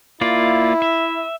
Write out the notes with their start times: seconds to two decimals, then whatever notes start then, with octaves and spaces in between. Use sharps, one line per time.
0.21 A#3 E4 F4 D5
0.82 E5